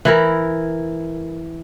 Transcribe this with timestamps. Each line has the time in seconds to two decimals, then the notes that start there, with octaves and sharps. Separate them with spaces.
0.05 E3 E4 A#4